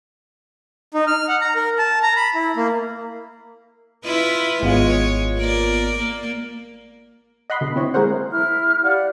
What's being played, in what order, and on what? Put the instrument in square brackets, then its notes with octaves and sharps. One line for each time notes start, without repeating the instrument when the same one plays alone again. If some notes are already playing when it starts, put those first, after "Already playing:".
[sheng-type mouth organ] D#4
F6
F#5
A#5
A#4
A5
A#5
B5
E4
A#3
[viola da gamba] E4 F4 B4
[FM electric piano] G#1 B3 F4 [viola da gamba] G#3 C#5
[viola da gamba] A#3 A#4 D5
A#3
[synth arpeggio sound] D#5 F#5 B5 C6
B2 D3
C4 E4 C#5
G#3 A#3 G#4 A#4 C5 F#5
[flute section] E4 F6
G4 D5 F5 F#5